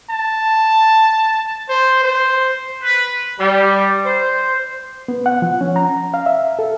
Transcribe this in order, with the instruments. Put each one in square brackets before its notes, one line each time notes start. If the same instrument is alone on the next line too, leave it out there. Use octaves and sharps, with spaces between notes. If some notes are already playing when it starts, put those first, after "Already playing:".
[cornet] A5
C5
C5
[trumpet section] B4
[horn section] G3
C5
[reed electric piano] B3
F#5
F3
C#4
A#5
F5
E5
A4